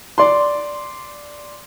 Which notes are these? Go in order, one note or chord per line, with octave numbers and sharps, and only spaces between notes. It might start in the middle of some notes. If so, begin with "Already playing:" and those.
D5 C6